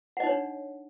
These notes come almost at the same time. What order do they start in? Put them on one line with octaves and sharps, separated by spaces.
F#5 D#5 D#4 C#5 D4